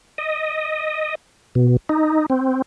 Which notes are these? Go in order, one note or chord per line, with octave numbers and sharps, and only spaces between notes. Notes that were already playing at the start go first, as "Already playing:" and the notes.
D#5
B2
D#4
C4